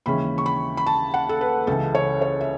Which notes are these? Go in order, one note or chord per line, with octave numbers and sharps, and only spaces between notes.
D#2 C#3 E3 G#3 C#4 B5
C#6
B5
B5
A5
F#5
A4
B4
C#2 C#3 E3 A4
C#5
C#5
E5